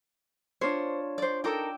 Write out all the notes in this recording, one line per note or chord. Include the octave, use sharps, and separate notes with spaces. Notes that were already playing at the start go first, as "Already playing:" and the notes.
D4 F4 C5 C#5
C5 D5
D#4 A4 A#4 G5 D6 E6